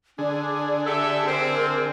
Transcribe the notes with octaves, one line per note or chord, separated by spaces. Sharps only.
D3 D4 G#4
G4 A4 E5
C4 A#4